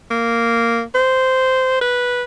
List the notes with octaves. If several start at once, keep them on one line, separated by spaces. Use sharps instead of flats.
A#3
C5
B4